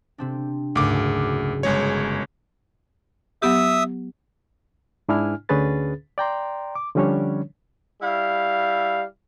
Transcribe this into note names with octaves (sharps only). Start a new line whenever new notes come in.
C3 C4 D4
F#1 D2 G#2 D6
G1 G#3 C#5
F#3 B3 G4 E5 D#6 E6
G#2 D4 E4 G#5 F6
D2 D3 C#4 G#4 B4 A6
D5 G5 A#5 C6
D6
D3 F3 G3 C#4 D4 C#5
G3 E4 F5